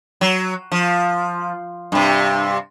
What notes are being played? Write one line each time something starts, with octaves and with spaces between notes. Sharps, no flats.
F#3
F3
G2 C3